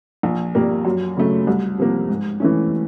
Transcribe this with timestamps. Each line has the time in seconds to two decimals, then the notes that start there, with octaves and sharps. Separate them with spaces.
0.23 A#1
0.55 A#2 G3 A#3
0.85 F#2
1.17 C#3 F#3 A3
1.47 C2
1.78 C3 F3 A#3
2.08 G#2
2.40 E3 A3 C#4